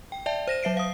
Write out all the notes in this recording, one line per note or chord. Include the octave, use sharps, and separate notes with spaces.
G5
D5 E5 G5 A5
C5 A#6 E7
F#3 E5 C7 D7
F5 D#6